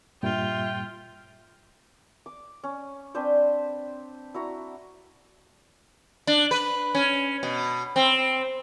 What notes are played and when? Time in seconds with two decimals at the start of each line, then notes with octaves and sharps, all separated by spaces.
0.23 G2 A#2 G3 F4 E5 G5
2.26 D6
2.63 C#4
3.15 C4 D4 B4 C5
4.34 E4 F#4 A#5
6.27 D4
6.51 B4
6.95 C#4
7.43 B2
7.96 C4